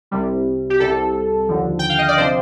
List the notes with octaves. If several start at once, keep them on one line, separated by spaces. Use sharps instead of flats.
C2 C3 G3
G4
C2 C3 G3 A4
D#2 D3 F3
G5
F5
D#5
D5
C3 F3 C5